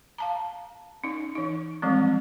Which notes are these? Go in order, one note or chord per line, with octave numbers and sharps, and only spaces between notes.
F5 A5 A#5
C#4 D#4
E3 D#4
E3 F3 G3 G#3 C4